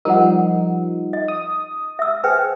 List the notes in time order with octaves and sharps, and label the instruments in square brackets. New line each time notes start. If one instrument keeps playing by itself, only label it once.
[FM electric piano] F3 G3 D#4 [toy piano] A#4 F#5
[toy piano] D#5
[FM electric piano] D#6
[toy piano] E5 E6
[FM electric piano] G#4 [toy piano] B4 C5 G5